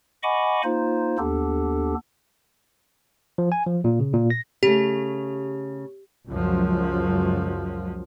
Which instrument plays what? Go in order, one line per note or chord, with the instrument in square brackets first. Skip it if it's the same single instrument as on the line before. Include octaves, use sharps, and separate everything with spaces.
[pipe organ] D#5 F#5 G#5 B5 C#6 D6
A#3 D#4 F4 C5
D#2 B3 D4 G4 A4
[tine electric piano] F3
G#5
F3
A#2
C#3
A#2
A#6
[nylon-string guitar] C#3 A3 [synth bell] G4
[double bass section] C#2 F#2 F3